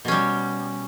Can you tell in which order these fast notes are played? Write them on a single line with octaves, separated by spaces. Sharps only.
B2 C#4 G3